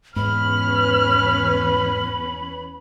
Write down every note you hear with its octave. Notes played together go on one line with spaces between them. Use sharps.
E2 G#2 C#4 B4 B5 F6